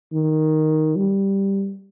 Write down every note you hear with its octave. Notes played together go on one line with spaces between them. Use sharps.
D#3
G3